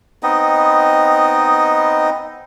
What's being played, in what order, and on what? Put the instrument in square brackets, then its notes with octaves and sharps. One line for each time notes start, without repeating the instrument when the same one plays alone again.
[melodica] B3 C4 D#4 D#5